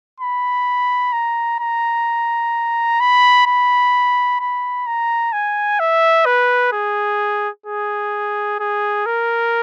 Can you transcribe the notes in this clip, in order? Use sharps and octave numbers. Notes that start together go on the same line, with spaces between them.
B5
A#5
A#5
B5
B5
B5
A#5
G#5
E5
B4
G#4
G#4
G#4
A#4